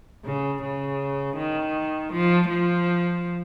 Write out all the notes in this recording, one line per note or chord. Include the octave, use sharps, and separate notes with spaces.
C#3
C#3
D#3
F3
F3